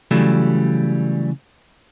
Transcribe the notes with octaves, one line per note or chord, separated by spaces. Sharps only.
C#3 E3 F#3 G3 A3